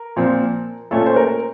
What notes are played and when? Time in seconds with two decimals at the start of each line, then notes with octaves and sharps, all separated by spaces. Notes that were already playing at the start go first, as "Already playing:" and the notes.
Already playing: A#4
0.16 A#2 F3 C4
0.91 A#2 A3 C#4 F4 A4
1.06 C5
1.16 A#4